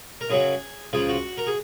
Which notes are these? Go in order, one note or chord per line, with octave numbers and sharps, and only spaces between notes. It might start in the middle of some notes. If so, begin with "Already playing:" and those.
A#4
F#2 C#3 F#3 G#4
C#2 C#3 F3 G#4
F#4
A#4
G#4